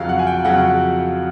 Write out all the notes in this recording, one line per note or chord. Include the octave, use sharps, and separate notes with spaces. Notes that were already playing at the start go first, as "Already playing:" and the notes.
Already playing: F2 C#3 F#3 F5
F#5
G#5
G5
F2 C#3 F#3 F#5